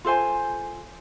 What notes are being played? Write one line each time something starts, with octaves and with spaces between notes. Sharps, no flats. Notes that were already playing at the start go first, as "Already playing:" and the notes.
F4 A4 C5 G#5